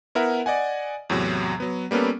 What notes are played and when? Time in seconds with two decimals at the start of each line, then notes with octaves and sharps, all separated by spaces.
0.15 B3 E4 A#4 E5 F#5
0.46 D5 D#5 F#5 G#5
1.10 E2 A2 C3 F#3
1.60 F#3 B3
1.91 G3 A#3 B3 C#4 A4